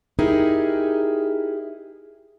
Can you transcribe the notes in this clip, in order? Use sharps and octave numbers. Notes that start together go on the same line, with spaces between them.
D#4 E4 G4 G#4 A#4